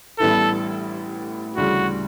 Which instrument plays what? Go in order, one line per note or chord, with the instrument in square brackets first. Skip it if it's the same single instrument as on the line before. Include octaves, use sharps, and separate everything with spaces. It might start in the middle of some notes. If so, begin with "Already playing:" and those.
[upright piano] A1 A2 G3 B3 E4 [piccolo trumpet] A4
[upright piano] D2 C#3 E3 G3 [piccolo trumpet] F#4